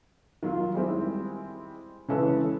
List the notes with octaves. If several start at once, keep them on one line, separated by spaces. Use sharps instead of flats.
D#3 F#3 F4
G3 G#3 C4 E4
C#3 E3 G#3 C#4 A4 B4